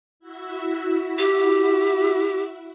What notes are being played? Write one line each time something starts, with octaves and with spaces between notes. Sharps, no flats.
E4 F#4 E5
G4